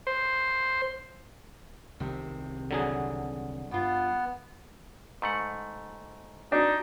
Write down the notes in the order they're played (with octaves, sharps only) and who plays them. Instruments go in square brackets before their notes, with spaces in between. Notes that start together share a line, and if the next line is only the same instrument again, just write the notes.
[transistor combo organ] C5
[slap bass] C2 D#3 [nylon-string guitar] C3
[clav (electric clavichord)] D3 F#3 G#4
[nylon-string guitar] G2 F4 [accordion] B3
[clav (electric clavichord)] G#2 A3 F#5
[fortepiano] D4 [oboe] D#4 [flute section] F#4